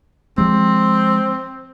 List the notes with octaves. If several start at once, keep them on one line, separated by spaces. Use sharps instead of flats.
F3 G#3 C4